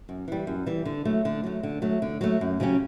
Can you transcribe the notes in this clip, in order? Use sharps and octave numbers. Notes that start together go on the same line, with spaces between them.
F#2
E3 G3
F#2
E3 G3
D3
F#3 A3
D3
F#3 A3
D3
F#3 A3
D3
F#3 A3
F#2
C#3 F#3 C#4 G4